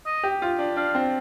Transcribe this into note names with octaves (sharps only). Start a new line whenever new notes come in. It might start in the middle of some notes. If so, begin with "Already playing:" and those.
D#5
G4
F4
D4
D4 F5
C4